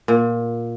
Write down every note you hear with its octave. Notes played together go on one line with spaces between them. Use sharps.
A#2